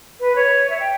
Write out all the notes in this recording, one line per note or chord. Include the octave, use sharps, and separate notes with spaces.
B4
C#5
E5
G5